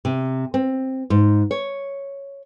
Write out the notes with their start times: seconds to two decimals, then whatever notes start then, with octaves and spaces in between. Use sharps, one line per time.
0.05 C3
0.54 C4
1.10 G#2
1.51 C#5